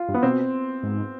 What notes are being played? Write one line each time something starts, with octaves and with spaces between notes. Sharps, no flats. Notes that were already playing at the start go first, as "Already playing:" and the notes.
Already playing: F4
G2
B3
B2 C4
G#2